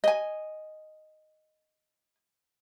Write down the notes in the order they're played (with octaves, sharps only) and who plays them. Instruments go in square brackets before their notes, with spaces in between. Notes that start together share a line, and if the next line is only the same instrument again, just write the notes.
[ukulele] D#5 G#5